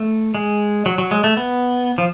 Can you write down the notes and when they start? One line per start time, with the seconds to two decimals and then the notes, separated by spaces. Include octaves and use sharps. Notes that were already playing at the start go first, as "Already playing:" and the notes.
Already playing: A3
0.35 G#3
0.86 F#3
0.98 F#3
1.11 G#3
1.24 A3
1.37 B3
1.98 F3